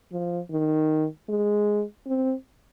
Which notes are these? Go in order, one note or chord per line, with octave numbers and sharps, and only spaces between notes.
F3
D#3
G#3
C4